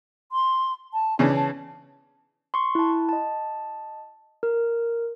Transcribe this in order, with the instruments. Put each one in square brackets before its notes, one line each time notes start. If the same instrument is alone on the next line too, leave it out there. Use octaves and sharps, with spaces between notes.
[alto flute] C6
A5
[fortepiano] C#3 E3 C#4 [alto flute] D4
[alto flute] A5
[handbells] C6 C#6
E4 A5
D#5 A5
A#4